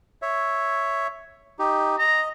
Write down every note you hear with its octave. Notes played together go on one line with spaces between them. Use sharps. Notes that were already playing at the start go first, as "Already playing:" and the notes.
C#5 E5
D#4 G4
D#5 A#5